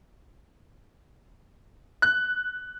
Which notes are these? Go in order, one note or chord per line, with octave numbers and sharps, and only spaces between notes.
F#6